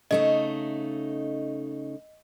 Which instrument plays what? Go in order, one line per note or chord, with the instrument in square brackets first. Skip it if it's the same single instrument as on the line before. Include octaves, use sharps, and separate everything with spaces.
[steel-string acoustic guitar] C#3 A3 D#4 [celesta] D#5